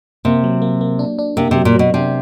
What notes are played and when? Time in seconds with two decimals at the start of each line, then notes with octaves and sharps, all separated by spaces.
0.25 C3 A#3
0.44 F#3
0.62 A#3
0.81 A#3
0.99 D4
1.19 D4
1.37 C3 A#3
1.51 C3
1.56 F#3
1.65 A#2
1.74 F#3
1.79 B2
1.94 C3 D4